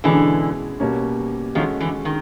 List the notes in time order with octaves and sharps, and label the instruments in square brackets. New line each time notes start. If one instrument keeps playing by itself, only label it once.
[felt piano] B2 G#3 C#4 E4 G#4 [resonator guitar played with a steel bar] D3 E3
[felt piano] B2 G3 A#3 C#4
[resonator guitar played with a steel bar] D#3 F3 [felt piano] G#3 C#4 F#4 A4
[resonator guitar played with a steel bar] D3 E3
D#3